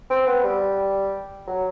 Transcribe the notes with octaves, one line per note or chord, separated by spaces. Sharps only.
C4
B3
G3
F#3